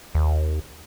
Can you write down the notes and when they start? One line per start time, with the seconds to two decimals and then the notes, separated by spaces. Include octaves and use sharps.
0.15 D#2